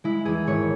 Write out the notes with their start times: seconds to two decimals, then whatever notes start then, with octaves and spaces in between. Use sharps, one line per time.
0.04 G#3 E4
0.25 E2 G#4
0.47 G#1 C#5